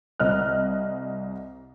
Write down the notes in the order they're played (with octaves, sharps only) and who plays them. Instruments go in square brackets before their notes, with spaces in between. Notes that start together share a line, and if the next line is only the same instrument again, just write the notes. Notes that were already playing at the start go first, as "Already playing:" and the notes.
[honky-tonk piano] C2 D#5 F6 F#6